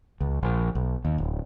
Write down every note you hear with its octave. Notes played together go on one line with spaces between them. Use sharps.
C#2
A#1
B1
D#2
D1